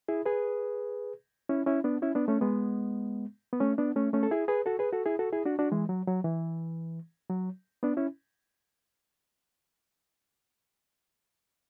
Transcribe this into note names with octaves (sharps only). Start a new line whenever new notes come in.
E4 G#4
G#4 B4
C#4 E4
C#4 E4
B3 D4
C#4 E4
B3 D4
A3 C#4
G#3 B3
B3
A3 C#4
B3 D4
A3 C#4
A3 C#4
A4
E4 G#4
G#4 B4
F#4 A4
G#4 B4
F#4 A4
E4 G#4
F#4 A4
E4 G#4
D4 F#4
D4 F#4
E3 G#3
F#3
F#3
E3
F#3
B3 D4
C#4 E4